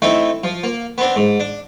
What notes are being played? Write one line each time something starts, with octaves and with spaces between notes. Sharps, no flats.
A3 C4 D#4 E4
F3
A#3
B3 C4 D4
G#2
D4